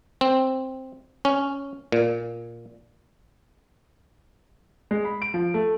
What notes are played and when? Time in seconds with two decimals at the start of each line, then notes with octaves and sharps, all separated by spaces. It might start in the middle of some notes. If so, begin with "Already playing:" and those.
0.21 C4
1.25 C#4
1.92 A#2
4.91 G#3
5.05 B5
5.22 D7
5.34 F3
5.54 A3